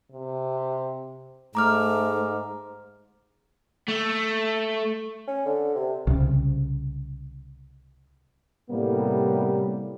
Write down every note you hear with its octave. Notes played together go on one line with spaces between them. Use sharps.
C3
G#2 A3 A#5 D6 F6
A3
C#4
D3
C3
C2 C#3
A2 C3 G3 A#3 B3